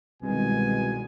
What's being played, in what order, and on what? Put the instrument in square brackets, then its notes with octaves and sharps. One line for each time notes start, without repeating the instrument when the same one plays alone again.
[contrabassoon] C2 [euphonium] B2 [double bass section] D#3 G#3 [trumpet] G#5